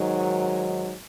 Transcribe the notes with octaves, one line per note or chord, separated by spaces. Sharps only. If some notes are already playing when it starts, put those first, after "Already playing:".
Already playing: G#2 D#3 F#3